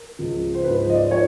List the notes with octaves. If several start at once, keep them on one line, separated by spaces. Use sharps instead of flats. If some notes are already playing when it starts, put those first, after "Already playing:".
Already playing: A#4
C#2 C#3 F3
C5
G#2 F3 B4
C5
D#5
D5
F3 C#5